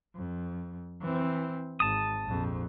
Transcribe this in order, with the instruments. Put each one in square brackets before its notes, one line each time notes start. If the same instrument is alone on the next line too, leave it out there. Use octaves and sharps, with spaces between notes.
[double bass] F2
E3 C4
[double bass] G#1 [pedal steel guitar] A5 D#6
[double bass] A#1 F2